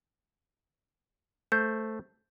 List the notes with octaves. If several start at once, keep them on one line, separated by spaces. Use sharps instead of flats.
A3 C5 G6